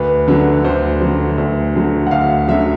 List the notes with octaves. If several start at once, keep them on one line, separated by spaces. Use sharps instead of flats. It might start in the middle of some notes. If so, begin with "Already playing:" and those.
Already playing: D2 B4
D3 F#3
D2 C5
D3 F#3
D2
D3 F#3
F#5
D2 F5
D3 F#3 E5